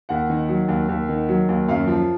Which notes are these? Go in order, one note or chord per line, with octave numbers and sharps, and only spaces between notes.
D#2 F#5
D#3
F#3
D#2
D#2
D#3
F#3
D#2
F#2 F5
F3